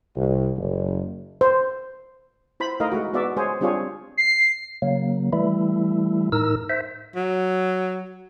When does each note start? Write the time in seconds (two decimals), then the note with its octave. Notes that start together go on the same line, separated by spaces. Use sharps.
0.15 C2
0.56 F#1
1.41 C5
2.60 E4 C5 B5
2.80 A3 D#4 E4 A#4 D#5 F5
2.92 G#3 A3 F#4
3.13 G#3 B3 F#4 D5 E5
3.36 G#3 G#4 C5 C#5
3.61 G3 C4 D4 F4 G#4 C#5
4.17 C7
4.82 C#3 F#3 A#3
5.33 E3 G3 A3 E4
6.32 A2 D#4 A#4 E6
6.70 C5 E5
7.16 F#3